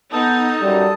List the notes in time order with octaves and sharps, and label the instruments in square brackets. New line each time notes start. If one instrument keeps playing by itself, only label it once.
[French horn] B3 [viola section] D#4 [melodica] A4 A5 D#6
[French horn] F#2 [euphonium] G3